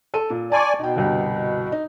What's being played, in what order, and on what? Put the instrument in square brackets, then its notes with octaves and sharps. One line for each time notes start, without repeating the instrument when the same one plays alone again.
[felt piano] A4 D#7
A#2
[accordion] D5 G#5 [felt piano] A5 C6 C#6
[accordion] B2 [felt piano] D#4 G5
[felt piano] G1 C2 G5
D#4